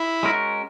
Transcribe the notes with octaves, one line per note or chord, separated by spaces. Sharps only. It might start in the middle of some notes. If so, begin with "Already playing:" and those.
Already playing: E4
G#3 C#4 F#4 A#4